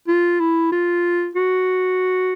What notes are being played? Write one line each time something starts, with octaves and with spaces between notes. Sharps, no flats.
F4
E4
F4
F#4